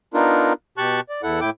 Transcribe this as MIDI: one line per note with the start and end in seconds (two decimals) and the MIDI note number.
0.14 0.53 59
0.14 0.53 62
0.14 0.53 63
0.14 0.53 65
0.14 0.53 70
0.78 1.00 47
0.78 1.00 67
0.78 1.00 81
0.78 1.00 85
0.78 1.00 90
1.09 1.22 74
1.23 1.40 40
1.23 1.40 64
1.23 1.40 69
1.23 1.40 78
1.41 1.50 45
1.41 1.50 64
1.41 1.50 79
1.41 1.50 86